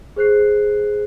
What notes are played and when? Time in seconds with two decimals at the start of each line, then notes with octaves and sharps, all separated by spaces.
0.16 G#4 C5 F#6 C7